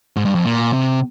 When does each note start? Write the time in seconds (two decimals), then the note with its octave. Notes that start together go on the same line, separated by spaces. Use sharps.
0.16 G#2
0.25 G2
0.35 F2
0.45 A#2
0.73 C3